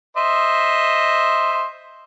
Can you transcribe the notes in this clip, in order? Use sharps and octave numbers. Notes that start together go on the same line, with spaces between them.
C5 D#5 E5